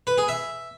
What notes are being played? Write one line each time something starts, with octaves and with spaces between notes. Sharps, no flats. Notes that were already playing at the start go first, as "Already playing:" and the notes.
B4
G#4
E5